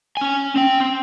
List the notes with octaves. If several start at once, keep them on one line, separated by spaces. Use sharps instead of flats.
C#4 G#5
C4 G5
C4